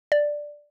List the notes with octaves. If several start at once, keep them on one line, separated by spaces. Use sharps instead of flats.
D5